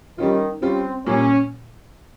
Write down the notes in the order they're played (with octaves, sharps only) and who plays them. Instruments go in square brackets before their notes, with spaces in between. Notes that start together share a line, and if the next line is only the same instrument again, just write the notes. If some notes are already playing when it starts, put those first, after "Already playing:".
[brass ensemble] D#3 [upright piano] G3 C#4 F4
[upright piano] G3 C#4 F4 [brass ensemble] C4
[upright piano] A#2 G3 A#3 F4 [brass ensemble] C#4